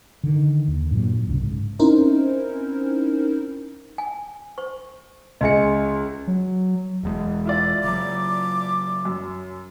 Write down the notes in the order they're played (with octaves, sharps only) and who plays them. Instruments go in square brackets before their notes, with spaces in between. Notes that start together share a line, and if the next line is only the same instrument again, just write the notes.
[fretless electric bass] D3 D#3
D#2
G2 A#2 F#3
E1 C2 C#3
G#2
[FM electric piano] C4 C#4 D#4 E4 A#4 C5
[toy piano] G#5
C5 C#6
[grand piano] C#2 G#4 C#7 [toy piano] D#5 E5
[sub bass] F#3
[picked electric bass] E1 E2 G#3
[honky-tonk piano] E4 F4 D5
[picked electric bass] C#3 F#3 [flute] D6
[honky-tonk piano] F#2